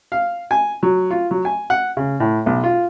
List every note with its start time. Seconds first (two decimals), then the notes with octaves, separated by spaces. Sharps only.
0.12 F5
0.51 G#5
0.83 F#3
1.11 F4
1.31 F#3
1.45 G#5
1.70 F#5
1.97 C#3
2.20 A2
2.46 B1
2.64 F4